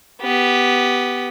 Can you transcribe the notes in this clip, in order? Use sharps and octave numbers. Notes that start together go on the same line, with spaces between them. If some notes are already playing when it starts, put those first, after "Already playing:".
B3 G4